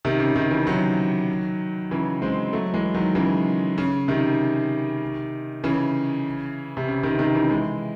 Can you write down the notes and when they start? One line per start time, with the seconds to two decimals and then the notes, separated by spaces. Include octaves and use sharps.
0.05 C3 D#3
0.20 C#3
0.36 C3 D#3
0.51 C#3 E3
0.67 D#3 F#3
1.91 C#3 E3
2.22 G#3 C4
2.53 F#3 A3
2.74 E3 G#3
2.95 D#3 F#3
3.15 C#3 E3
3.78 C#3
4.08 C3 D#3
5.64 C#3 E3
6.77 C3
6.88 C#3
7.03 C3 D#3
7.19 C3 D#3
7.34 C#3 E3
7.50 E3 G#3